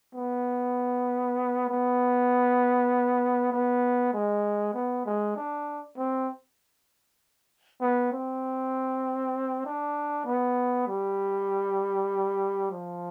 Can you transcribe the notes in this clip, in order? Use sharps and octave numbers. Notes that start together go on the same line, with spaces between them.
B3
B3
B3
G#3
B3
G#3
D4
C4
B3
C4
D4
B3
G3
F3